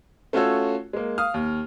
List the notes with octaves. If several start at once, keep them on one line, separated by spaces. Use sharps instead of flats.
A3 C#4 F4 F#4 A4 C#5
G#3 A#3
F5 D#6 F6
D#2